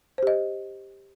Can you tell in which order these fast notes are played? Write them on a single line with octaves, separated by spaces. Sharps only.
C5 G4 D#5